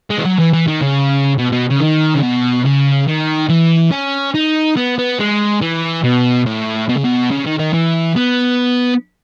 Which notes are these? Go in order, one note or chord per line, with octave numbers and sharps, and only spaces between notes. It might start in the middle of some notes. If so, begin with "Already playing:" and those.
G#3
E3
F#3
E3
E3
D#3
C#3
B2
B2
C#3
D#3
C#3
B2
C#3
D#3
E3
C#4
D#4
B3
B3
G#3
E3
B2
A2
B2
C#3
B2
C#3
D#3
D#3
E3
B3